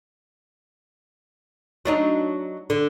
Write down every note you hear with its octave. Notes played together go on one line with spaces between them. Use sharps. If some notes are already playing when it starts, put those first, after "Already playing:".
F#3 D4 D#4
D3